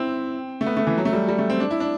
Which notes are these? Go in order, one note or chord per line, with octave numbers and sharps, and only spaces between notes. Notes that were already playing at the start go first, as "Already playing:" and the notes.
Already playing: C4 E4
A3
B3
A3
E3
F#3
A3
G3
G3
A3
C4
D4
E4
D4